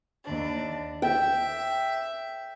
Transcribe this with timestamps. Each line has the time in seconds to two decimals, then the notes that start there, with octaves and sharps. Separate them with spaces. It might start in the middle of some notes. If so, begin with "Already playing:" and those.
0.23 D#2 D4
1.02 E5 G5